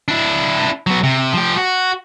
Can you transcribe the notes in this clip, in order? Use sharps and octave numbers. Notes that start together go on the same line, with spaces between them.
D4 E4
F#3 B3
C3
F3 G4
F#4